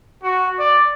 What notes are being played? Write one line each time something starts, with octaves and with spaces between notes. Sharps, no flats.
F#4
D5